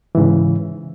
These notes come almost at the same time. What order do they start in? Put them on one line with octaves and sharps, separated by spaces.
E3 G#2 C#3